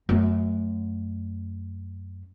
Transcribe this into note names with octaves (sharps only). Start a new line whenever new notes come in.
F#2 A3